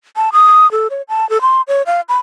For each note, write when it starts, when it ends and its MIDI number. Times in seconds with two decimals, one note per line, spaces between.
0.16 0.30 81
0.33 0.70 87
0.71 0.88 69
0.90 1.02 73
1.09 1.28 81
1.30 1.41 69
1.41 1.62 84
1.68 1.82 73
1.86 2.01 77
2.09 2.17 83